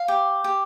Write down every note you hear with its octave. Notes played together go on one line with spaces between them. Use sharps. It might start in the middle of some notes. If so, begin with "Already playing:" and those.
Already playing: F5
G4
G4